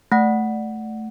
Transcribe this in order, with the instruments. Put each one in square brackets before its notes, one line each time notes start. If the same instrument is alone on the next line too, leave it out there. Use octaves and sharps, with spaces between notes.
[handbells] A3 F#5